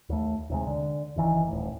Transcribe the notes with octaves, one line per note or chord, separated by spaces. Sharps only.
D#2 A3
D#2 C3 G#3
D3
F#1 D#3 E3
D#1 A2